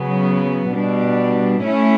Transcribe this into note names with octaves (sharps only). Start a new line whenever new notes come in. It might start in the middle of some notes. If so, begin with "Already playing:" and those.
Already playing: C#3 F#3 B3
B2 G3 D4
A3 C#4 E4